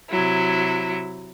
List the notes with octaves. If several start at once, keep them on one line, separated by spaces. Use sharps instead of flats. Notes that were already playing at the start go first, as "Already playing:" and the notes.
C3 F#3 E4